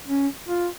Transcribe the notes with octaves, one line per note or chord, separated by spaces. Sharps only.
C#4
F4